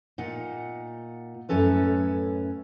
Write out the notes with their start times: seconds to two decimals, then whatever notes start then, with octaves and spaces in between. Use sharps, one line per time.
0.18 A#2 D#4 F#5
1.49 F#2 A2 C#4 A4 B4